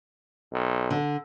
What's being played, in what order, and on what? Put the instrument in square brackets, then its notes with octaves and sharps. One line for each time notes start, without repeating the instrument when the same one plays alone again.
[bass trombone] B1
[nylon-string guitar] D3